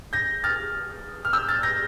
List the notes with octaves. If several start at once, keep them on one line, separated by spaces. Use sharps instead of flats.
G6 A#6
F6 A6
F6
E6 G6
F6 A6
G6 A#6